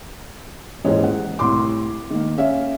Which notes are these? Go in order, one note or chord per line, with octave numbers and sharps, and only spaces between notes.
D#1 A1 G#2 E3 C#5
F#5
C2 A2 C6 D6
D#3 A#3
C#4 E5 F5